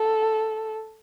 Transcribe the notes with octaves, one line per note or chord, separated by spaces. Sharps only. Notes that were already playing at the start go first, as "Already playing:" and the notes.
Already playing: A4